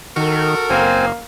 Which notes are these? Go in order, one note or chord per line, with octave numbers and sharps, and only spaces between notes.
D#3 F#4 A4 A#4
F#1 A#3 C4 C5 G#5